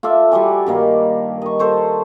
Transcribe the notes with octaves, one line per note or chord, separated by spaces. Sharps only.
F4 A4 D5 E5
G3 F#4 D5 G#5
G2 D#3 A#3
D#5 C#6
A4 C5 C#5